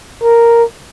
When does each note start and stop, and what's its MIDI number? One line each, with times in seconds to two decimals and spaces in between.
0.23 0.64 70